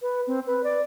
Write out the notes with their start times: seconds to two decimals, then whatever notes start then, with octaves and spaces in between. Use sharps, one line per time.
0.02 B4
0.27 C4
0.47 B4
0.64 D5